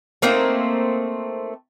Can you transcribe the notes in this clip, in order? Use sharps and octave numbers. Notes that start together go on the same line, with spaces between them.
A3 A#3 C4 D#4